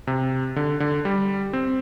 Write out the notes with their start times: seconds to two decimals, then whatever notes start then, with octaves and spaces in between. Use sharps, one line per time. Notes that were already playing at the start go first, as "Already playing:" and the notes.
0.07 C3
0.56 D3
0.80 D3
1.05 G3
1.53 C4